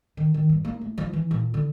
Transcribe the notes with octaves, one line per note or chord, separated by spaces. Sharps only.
D#3
D#3
G2
A#3
A3
F3
E3
A#2
D3